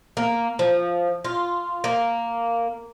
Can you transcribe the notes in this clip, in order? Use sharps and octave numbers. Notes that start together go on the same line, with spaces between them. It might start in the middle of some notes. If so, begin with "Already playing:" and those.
A#3
F3
F4
A#3